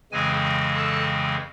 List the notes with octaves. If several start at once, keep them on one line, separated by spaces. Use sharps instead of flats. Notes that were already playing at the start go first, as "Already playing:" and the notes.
F2 C#3 E3 G#3 C4 G#4 G#5
A4 A5